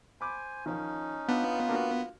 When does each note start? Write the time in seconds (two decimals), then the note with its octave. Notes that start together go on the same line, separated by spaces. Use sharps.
0.21 C5 G#5 B5 D6
0.66 D#3 F3 C#4 D#4
1.29 B3 D4 F4
1.69 A#3 D4 F#4